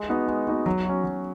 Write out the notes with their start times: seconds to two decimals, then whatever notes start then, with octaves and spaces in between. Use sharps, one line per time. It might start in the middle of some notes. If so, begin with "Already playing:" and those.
Already playing: G#3
0.09 B3 D#4 F#4
0.28 G#3
0.47 B3 D#4 F#4
0.66 F#3
0.85 C#4 F#4
1.04 F#3